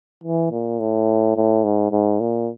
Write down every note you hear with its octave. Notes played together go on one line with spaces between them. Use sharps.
E3
A#2
A2
A2
G#2
G#2
A#2